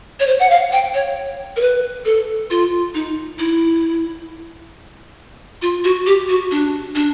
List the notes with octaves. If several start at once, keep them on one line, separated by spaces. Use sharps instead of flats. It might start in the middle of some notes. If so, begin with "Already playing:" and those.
C#5
C5
F#5
F5
G5
C#5
A#4
B4
A4
F4
D#4
E4
F4
F#4
G4
F#4
D4
D4